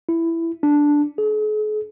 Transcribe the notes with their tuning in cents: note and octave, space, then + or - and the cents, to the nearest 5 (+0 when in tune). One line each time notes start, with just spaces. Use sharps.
E4 +10
D4 +0
G#4 +45